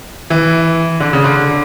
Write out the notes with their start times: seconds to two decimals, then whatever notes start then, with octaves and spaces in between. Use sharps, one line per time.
0.30 E3
1.00 D3
1.13 C#3
1.24 D3